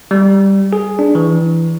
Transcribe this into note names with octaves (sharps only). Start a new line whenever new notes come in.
G3
G#4
D4
E3